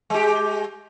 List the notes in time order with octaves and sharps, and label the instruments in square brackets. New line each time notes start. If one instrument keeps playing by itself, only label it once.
[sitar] G#3 G4